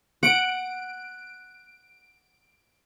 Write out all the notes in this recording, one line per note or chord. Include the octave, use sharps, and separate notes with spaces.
F#5 D7